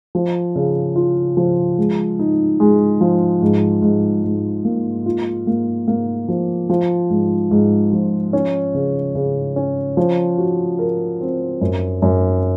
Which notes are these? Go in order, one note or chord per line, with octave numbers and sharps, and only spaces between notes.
F3
C#3
F4
F3
G#3
D#4
G#3
F3
G#2
G#2
G#2
A#3
F4
A#3
A#3
F3
F3
G#2
G#2
F3
C#4
C#3
C#3
C#4
F3
F#4
A#4
C4
F#2
F#2